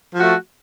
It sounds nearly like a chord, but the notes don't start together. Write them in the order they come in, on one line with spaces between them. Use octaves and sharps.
F3 F#4 A3